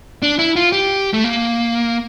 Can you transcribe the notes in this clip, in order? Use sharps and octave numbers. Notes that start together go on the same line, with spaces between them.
D4
E4
F4
G4
A3
A#3